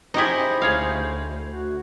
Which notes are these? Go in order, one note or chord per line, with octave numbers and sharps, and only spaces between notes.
D#4 E4 G4 G#4 C5 D#5
D2 G#4 C#5 F5
F#4